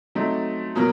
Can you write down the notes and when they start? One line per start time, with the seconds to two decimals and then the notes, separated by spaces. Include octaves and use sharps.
0.15 F#3 A3 C4 D#4
0.75 B2 F#3 A#3